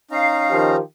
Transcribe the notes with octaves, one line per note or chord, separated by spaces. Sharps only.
C#4 D#4 F5 A#5
D#3 F3 G4